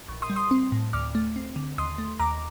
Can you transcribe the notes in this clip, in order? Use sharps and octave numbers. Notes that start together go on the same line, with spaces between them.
A#1
C6 D#6
G3
C6 D#6
C4
A2
D2 D6 F6
A3
C4
D3
D#2 C6 D#6
A3
D#2 A#5 D6